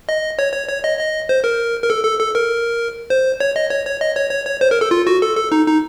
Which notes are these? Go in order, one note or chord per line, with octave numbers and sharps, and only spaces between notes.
D#5
C#5
C#5
C#5
D#5
D#5
C5
A#4
A#4
A4
A4
A4
A#4
C5
C#5
D#5
C#5
C#5
D#5
C#5
C#5
C#5
C5
A#4
A4
F4
F#4
A4
A4
D#4
D#4